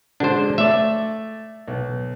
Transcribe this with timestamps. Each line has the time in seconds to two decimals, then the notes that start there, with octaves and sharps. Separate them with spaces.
0.20 D3 G#3 D4 C5
0.58 A3 D5 E5
1.68 B1